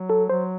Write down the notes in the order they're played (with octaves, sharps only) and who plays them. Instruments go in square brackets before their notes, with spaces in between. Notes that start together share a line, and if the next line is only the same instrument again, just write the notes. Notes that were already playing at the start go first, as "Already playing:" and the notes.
Already playing: [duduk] F#3
[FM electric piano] A4
[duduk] F#3 [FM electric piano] C5